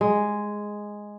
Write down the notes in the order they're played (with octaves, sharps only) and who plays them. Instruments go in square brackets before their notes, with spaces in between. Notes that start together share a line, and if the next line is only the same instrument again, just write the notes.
[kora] G#3